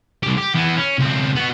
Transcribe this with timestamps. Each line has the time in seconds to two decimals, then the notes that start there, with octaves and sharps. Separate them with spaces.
0.23 C2 G4
0.37 G4
0.54 E3 B3
0.77 C#4
0.99 C#2 C4
1.36 B3 F#4